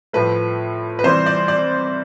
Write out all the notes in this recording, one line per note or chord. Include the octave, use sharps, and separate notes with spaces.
A2 F3 A3 B4
B4
C3 E3 G3 C5
D5
D5